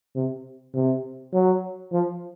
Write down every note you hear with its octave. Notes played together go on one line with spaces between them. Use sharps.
C3
C3
F#3
F3